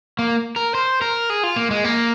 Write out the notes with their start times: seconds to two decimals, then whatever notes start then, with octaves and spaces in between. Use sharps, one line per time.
0.19 A#3
0.56 A#4
0.75 C5
1.02 A#4
1.30 G#4
1.43 F4
1.56 A#3
1.71 G#3
1.84 A#3